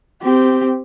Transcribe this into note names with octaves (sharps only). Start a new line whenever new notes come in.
C4 G4